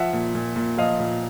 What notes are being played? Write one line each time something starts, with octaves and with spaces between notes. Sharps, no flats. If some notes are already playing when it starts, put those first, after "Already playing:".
Already playing: F3 E5 F#5
A#2
A#2
A#2
F3 D#5 F5
A#2